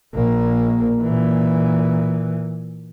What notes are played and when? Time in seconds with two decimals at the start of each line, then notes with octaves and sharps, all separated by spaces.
0.15 A#1 A#3
1.01 A#2 E3